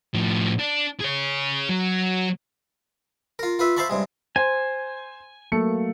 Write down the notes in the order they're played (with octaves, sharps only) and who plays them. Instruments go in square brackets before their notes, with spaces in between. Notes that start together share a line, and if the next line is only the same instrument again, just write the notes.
[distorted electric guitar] A2 F3
D4
G#4 C#5
F#3
[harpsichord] F4 A#4
F4 B4 E5
C5 E5 F5 A5 B5 C#6
G2 C3 G#3
[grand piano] C5 [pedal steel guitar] G#5
[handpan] F#3 A#3 [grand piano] A3 C#7